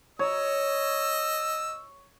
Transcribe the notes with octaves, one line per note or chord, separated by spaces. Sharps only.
C#5 D#5 E6